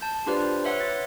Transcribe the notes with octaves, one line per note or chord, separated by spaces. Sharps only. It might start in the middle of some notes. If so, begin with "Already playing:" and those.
A5 G6
D4 F4 G4 B4 C5 D5
B4 C#5 E5 F#5 C6
A6